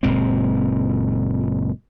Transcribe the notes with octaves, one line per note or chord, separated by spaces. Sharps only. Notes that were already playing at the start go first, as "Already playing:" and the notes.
F#1 A#2 G#3 C4